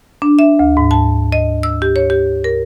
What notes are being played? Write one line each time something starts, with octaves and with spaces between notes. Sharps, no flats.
D4
E5
D2
G#2
A5
D#5
E6
G4
C#5
G4
A#4